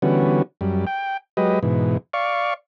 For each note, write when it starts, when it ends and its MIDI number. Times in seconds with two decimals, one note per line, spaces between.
0.02 0.42 50
0.02 0.42 52
0.02 0.42 55
0.02 0.42 59
0.02 0.42 61
0.02 0.42 66
0.61 0.85 42
0.61 0.85 55
0.87 1.17 79
1.37 1.59 54
1.37 1.59 56
1.37 1.59 67
1.37 1.59 71
1.37 1.59 75
1.63 1.97 44
1.63 1.97 47
1.63 1.97 52
2.13 2.54 74
2.13 2.54 77
2.13 2.54 85